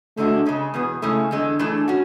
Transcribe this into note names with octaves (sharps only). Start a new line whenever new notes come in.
E2 D3 G#3 A3 D4 F#4
C#3 G#3 C#4
E2 B2 B3 G#4
C#3 G#3 A3 C#4 E4 G#4
E2 D3 G#3
E3 A3 D4 G#4
C#4 F#4